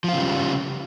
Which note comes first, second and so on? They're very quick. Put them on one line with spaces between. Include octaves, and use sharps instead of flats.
F3 F4 C#3 G3